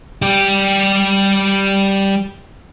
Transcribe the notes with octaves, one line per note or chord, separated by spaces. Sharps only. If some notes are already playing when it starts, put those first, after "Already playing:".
G3 G4